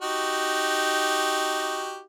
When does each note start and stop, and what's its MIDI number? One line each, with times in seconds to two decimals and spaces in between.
0.02 2.02 63
0.02 2.02 66
0.02 2.02 67